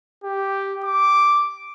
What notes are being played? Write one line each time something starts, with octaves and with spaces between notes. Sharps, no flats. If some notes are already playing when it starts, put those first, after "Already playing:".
G4
D6